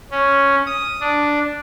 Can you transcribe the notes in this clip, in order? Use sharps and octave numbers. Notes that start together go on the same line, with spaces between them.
C#4
D#6
D4